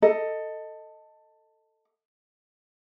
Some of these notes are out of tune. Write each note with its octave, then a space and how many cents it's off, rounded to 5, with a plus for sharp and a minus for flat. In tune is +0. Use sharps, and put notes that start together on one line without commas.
A4 +15 D#5 +5